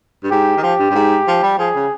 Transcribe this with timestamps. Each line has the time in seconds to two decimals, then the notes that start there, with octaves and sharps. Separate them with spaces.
0.23 G2
0.31 G#2 G4
0.57 D#3
0.62 F3 G4
0.79 G2
0.90 G2
0.95 G#2
1.28 F3
1.43 G3
1.59 F3 G#4
1.76 C#3